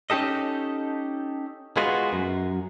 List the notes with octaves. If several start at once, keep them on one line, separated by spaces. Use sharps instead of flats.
C#4 D#4 G4 A4 D#5
G#3 B3 F4 F#4
F#2